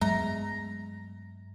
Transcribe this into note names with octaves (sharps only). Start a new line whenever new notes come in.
G2 F#3 G#3 A3 B3 A#5